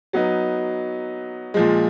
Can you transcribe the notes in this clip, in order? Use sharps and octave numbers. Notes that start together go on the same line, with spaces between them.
F#3 B3 D#4
A#2 F3 G#3